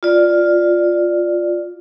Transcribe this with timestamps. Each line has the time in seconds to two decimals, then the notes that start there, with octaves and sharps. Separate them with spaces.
0.03 F4 D5